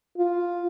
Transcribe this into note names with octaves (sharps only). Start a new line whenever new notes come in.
F4